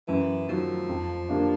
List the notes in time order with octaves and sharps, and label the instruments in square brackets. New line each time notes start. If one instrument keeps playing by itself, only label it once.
[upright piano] F#2 [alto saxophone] E3
[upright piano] D#3 F#3 [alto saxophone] F3
[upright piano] F2
D3 G3 A#3 D4